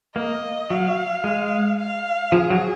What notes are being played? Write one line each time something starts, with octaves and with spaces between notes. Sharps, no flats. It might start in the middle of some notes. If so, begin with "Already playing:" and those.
A#3 D#5
F#3 F5
G#3
F5
F3 G#4
F#3